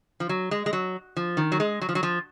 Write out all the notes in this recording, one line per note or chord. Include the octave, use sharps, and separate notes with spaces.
F3
F#3
G#3
G#3
F#3
F3
D#3
F#3
G#3
F#3
F3
F#3
F3